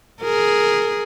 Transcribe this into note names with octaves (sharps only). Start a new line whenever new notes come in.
G#4 A#4